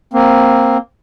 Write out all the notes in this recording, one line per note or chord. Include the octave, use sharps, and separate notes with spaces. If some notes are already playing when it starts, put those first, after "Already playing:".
A#3 C4